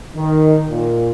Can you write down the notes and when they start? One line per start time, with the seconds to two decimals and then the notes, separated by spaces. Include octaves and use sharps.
0.15 D#3
0.68 A#2